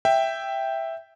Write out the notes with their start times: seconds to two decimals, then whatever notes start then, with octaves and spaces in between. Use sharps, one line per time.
0.05 E5 G5